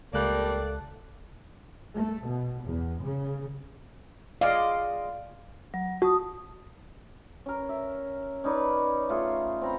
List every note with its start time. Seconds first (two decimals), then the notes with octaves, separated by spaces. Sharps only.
0.14 C#2 G3 A3 A#3 A4 D5 F#6
1.94 A3
2.25 B2
2.64 E2
3.01 C#3
4.41 G#3 D5 D#5 F5
5.74 F#3
6.02 F#4 A5 D#6
7.46 C#4 A#4
7.69 E5
8.44 C#4 D#4 B4 D5
9.09 A3 F4 G#4
9.62 C4 A#5 B5